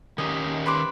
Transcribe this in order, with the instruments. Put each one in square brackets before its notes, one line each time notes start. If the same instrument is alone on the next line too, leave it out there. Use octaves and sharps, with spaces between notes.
[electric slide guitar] D#3 C#4 G4 [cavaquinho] D#5
[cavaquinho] B4 C5 D6